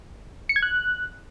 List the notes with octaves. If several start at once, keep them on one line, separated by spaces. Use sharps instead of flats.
C#7
G#6
F#6